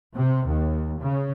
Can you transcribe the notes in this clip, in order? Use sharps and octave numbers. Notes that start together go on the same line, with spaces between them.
C3
D#2
C#3